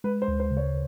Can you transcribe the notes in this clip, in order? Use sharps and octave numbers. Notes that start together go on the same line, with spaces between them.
G#3 B4
C5
D2
C5
C#3
C#5